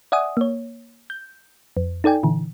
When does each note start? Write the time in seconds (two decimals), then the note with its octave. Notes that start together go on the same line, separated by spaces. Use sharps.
0.12 D5 E5 F#5 G#5 D#6
0.37 A#3 C#5
1.10 G6
1.77 F2
2.04 D#4 A4 D5 G5 G#5
2.23 A#2 D3 E3